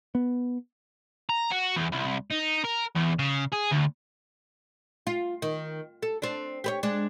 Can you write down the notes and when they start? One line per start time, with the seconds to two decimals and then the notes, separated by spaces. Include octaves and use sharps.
0.15 B3
1.29 A#5
1.51 F#4
1.76 E2
1.92 C2
2.31 D#4
2.64 A#4
2.95 E2
3.19 C#3
3.53 G#4
3.72 D2
5.07 F4
5.42 D#3
6.03 A4
6.22 C4 D4
6.64 G4 B4 C#5
6.83 G#3 D4